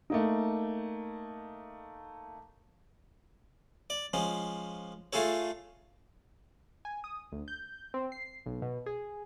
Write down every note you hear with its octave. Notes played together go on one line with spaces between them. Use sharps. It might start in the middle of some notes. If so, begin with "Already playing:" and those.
A3 A#3 D#4
D5
F3 G#3 C#4
A3 F4 G#4 A4 C#5
G#5
D#6
D2
G6
C4
C7
B1
B2
G#4